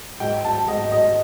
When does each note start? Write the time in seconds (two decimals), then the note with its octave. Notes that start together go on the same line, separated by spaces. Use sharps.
0.20 G#2 G5
0.44 A5
0.68 G#2 D#5
0.92 D#5